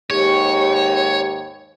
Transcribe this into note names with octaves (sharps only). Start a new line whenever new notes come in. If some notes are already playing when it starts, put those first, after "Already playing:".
D#2 G#2 G4 C#5